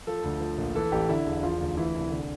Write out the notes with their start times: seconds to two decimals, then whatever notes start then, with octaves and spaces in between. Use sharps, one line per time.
0.07 F3 A4
0.24 D2
0.40 F3
0.58 A#1
0.75 E3 A4
0.92 A1 G4
1.09 D3 E4
1.26 E1
1.43 F3 F4
1.61 D2
1.77 E3 E4
1.95 C2 E4
2.11 D3